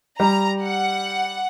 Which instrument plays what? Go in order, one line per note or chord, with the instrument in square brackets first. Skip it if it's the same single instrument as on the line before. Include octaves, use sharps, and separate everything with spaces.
[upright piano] G3 [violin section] A#5
[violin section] F#5